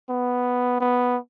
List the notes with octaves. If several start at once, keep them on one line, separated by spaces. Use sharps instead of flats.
B3
B3